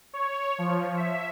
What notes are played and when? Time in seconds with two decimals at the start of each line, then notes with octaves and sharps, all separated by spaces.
0.13 C#5
0.58 F3
0.97 E5